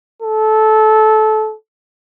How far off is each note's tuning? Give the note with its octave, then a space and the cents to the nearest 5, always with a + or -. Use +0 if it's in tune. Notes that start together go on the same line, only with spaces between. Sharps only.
A4 -20